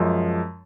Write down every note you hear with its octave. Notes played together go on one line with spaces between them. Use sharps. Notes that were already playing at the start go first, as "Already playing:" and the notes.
Already playing: F#2 F3 G#3